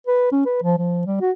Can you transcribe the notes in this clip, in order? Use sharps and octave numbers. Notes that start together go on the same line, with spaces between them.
B4
C#4
B4
F3
F3
G3
F#4